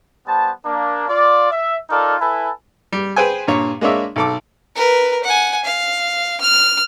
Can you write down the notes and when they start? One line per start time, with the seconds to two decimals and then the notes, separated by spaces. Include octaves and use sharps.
0.25 G3 B3 C5 A5
0.65 A#3 D4
1.08 F4 D5
1.50 E5
1.90 D#4 F4 A4 A#4 D5
2.19 E4 A4 B4 G#5 A5
2.92 G3
3.16 G#4 B4 C5 G5 G#5
3.47 G2 A#2 C#5
3.81 G#3 A#3 D4 C#5 E5
4.16 B1 A4 D6
4.75 A#4 B4
5.24 F#5 G#5
5.64 F5
6.41 F6